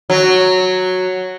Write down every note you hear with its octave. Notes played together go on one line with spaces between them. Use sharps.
F#3